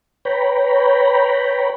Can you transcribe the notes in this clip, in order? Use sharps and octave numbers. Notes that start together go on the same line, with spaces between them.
B4 C#5 G5 A#5 B5